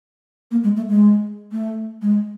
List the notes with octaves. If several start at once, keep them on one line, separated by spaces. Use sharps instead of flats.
A#3
G#3
A3
G#3
A3
G#3